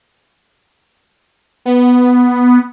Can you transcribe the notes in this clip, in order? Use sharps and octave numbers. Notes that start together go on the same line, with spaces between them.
B3